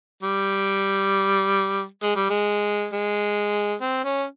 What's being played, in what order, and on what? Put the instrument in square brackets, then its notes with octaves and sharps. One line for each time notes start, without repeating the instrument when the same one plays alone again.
[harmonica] G3
G#3
G3
G#3
G#3
C4
C#4